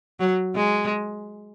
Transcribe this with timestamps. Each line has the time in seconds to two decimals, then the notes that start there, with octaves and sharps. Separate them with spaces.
0.20 F#3
0.56 G#3